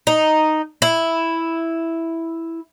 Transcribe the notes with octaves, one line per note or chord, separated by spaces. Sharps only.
D#4
E4